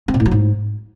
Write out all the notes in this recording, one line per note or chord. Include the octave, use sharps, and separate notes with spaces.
C4
B2
A2
F#3
G#2